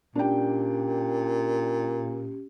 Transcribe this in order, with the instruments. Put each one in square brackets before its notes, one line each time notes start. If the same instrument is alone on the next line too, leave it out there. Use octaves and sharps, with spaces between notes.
[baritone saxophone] A#2 [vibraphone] C#4 G4 [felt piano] D4 G5